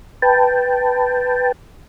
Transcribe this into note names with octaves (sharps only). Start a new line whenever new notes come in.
B4 G5 A5